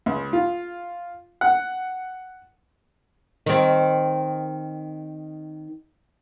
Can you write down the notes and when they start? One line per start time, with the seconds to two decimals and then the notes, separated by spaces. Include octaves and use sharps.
0.06 C#2
0.33 F4
1.41 F#5
3.46 D#3 C4